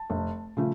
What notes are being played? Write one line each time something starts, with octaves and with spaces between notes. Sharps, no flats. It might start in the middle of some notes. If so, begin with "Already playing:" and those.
Already playing: A5
F1
C#3 F3 A3